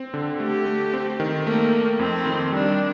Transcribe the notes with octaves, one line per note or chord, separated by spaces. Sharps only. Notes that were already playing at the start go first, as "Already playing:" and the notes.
Already playing: C4
D3
A3 G4
A3
C4
D#3
A3 A#3
A3
F2 C4
D#3
G3 D4